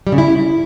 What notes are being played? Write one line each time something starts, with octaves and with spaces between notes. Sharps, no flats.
G3
C#3
E4